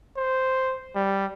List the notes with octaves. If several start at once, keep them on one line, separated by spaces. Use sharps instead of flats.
C5
G3